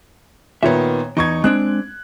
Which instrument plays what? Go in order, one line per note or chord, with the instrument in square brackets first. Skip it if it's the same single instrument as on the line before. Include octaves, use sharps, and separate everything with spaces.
[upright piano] A#2 D#3 B3 [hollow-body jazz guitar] C#5 E5
[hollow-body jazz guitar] E2 [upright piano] D#4 C#6 G#6
[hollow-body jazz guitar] G#3 C4 D4 [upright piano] F#6